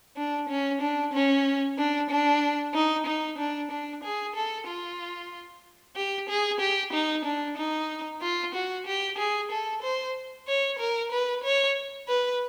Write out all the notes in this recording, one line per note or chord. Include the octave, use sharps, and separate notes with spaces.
D4
C#4
D4
C#4
D4
D4
D#4
D#4
D4
D4
G#4
A4
F4
G4
G#4
G4
D#4
D4
D#4
F4
F#4
G4
G#4
A4
C5
C#5
A#4
B4
C#5
B4